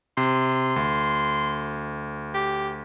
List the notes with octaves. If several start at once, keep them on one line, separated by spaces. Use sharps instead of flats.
C3 C6
D2
G4